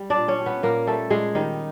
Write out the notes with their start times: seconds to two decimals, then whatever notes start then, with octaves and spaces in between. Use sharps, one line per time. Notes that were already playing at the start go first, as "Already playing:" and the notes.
Already playing: G3
0.10 D4 D5
0.17 A#2
0.28 C#4 C#5
0.40 G3
0.46 B3 B4
0.63 A#2 A#3 A#4
0.87 G3 A3 A4
1.10 A#2 G#3 G#4
1.34 D#3 G3 D#4